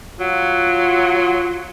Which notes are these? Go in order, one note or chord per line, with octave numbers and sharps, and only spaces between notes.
F#3 F4